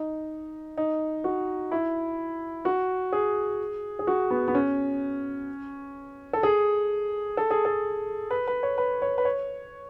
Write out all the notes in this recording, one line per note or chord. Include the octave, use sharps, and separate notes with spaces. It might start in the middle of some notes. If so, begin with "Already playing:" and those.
Already playing: D#4
D#4
F#4
E4
F#4
G#4
G#4
F#4
B3
B3
C#4
A4
G#4
A4
G#4
A4
B4
B4
C#5
B4
C#5
B4
C#5